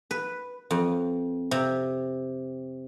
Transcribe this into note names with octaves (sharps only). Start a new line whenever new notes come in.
B4
F2
C3